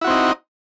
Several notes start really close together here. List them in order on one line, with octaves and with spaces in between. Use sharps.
E4 F#4 C4 D#4